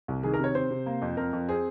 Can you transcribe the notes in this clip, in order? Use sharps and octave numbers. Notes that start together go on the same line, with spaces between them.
C2
D#3 G#4
A#4
C3 C#5
C3 C5
C3
A#3
F2
F2 A#4
F2
C4 G#4